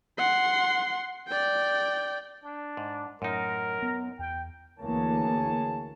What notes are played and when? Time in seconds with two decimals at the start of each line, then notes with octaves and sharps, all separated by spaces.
0.18 F#5 C6
1.29 D5 G5
2.44 D4
2.77 G#2
3.22 F#2 A2 D#4 A#4
3.82 B3
4.19 E2 G5
4.80 D2 E3 A#3 G#4 C#5 A5